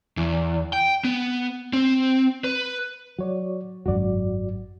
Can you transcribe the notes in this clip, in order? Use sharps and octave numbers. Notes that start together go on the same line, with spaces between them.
E2
G5
B3
C4
B4
F#3 F#4 C#5 D5
G#1 F#2 F#3 F#4 D5